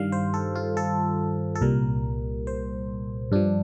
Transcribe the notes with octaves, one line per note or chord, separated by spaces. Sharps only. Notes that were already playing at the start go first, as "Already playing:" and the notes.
Already playing: G2 D#3 G3 F5
C5
A4
F4
A4
A4
C2 A#2 G3 A#4
C5
G2 F3 D4